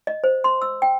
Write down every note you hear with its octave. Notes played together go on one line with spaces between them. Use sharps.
D#5
C5
C6
E6
G5